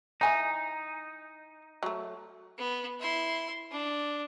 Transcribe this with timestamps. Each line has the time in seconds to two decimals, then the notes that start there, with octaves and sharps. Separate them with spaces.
0.21 E3 D#4 G#5 A#5
1.83 F#3 A3
2.58 B3
3.00 E4 C6
3.71 D4